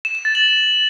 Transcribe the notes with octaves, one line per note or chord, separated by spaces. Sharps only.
E7
E7
A6
F#7